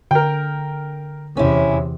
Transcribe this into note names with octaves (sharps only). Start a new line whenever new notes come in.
D3 A#4 G5
E2 C3 C#4 E4